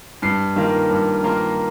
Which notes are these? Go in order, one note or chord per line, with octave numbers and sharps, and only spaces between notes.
G2 C7
D#3 A#3 F4
G2
D#3 A#3 F4